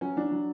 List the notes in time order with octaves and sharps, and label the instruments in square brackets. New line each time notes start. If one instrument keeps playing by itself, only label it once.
[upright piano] F#3 C#4
F#3 D4
F#3